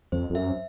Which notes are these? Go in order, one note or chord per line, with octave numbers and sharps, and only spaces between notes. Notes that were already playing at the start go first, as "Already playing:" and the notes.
F2 C5
F2
F#2 E5